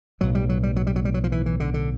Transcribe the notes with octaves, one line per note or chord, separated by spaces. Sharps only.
B1 A2 F#3
G3
F#3
G3
F#3
G3
F#3
G3
F#3
F3
E3
E3
D3
D3